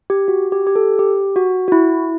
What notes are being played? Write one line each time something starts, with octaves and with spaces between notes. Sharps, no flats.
G4
F#4
G4
G4
A4
G4
F#4
F#4
E4